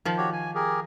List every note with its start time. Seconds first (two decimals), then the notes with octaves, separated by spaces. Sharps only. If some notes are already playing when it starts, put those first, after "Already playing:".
0.05 D#3 F3
0.18 F#4 G4 C#5
0.33 G#5
0.55 G4 G#4 A#4